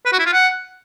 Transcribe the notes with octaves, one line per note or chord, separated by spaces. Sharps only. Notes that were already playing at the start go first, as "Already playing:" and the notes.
B4
F#4
E4
F4
F#5